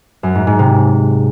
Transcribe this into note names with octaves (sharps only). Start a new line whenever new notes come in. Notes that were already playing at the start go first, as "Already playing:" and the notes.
F#2
G#2
G#2
C3